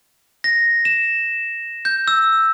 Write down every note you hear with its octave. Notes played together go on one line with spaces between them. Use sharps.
A#6
E7
G6
E6